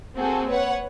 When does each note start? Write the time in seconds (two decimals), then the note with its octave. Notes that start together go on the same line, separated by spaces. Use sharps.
0.16 A#3 C4 F#4 G#4 A4
0.48 B4 C#5 F#5